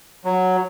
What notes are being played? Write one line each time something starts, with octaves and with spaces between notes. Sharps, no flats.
F#3